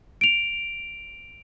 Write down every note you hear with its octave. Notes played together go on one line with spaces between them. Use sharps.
D7 F7